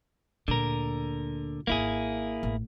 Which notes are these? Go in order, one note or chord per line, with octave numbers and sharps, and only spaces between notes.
D2 A#2 D3 A#4
G#1 A#3 E4 F4 G#4
A1